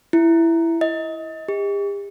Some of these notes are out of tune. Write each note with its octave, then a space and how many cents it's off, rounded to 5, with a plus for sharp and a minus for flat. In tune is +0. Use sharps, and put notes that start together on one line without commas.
E4 +10
D#5 +30
G4 +45